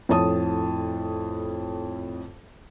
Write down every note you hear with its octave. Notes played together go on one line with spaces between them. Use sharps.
F2 A2 C#5 A5 D#6